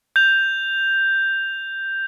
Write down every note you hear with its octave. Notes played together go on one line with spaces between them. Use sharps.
G6 F7